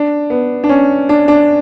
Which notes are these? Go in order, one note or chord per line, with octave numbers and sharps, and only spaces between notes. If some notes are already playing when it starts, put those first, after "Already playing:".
Already playing: D4
B3
D4
C#4
D4
D4